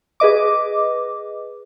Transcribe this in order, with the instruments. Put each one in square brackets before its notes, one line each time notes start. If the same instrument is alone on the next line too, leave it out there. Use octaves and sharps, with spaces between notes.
[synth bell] G#4 B4 D#5 D6